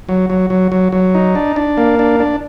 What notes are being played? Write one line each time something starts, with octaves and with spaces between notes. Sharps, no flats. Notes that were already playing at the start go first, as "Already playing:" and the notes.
F#3
F#3
F#3
F#3
F#3
D#4
D4
D4
A#3
D4
D4